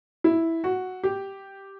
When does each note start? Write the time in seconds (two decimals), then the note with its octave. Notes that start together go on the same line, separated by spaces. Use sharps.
0.24 E4
0.64 F#4
1.03 G4